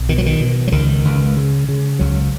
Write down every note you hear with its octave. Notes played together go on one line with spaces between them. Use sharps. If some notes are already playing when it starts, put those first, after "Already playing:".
Already playing: B1
B2 D#3
F#3
D#3
B2
F#3
C#2 D#3
C#2
C#3
C#3
C#2 F#3